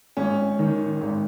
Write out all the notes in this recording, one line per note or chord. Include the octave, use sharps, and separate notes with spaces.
G#1 C#4
D#3
G#1